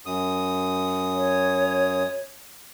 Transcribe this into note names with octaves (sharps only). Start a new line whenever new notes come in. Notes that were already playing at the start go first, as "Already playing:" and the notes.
F#2 D#6
C#5